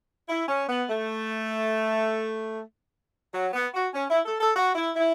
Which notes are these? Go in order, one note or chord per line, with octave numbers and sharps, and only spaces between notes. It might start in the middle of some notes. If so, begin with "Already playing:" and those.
E4
C#4
B3
A3
F#3
B3
F#4
C#4
E4
A4
A4
F#4
E4
E4